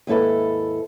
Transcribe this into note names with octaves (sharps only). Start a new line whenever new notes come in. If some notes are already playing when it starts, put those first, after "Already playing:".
D#2 G#2 E4 A4 B4